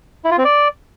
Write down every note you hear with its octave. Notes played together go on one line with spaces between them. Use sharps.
E4
F4
C4
D5